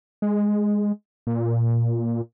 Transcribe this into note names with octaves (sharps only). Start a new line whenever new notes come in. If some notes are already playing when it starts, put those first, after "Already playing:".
G#3
A#2